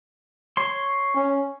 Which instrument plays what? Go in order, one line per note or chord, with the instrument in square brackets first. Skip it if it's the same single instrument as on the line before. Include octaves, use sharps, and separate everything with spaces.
[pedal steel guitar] C#5 C6
[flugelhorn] C#4